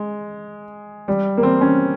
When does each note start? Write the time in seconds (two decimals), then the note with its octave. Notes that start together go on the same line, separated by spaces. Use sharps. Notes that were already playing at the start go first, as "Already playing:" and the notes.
Already playing: G#3
1.08 G3
1.38 A#3
1.43 C4
1.61 C#4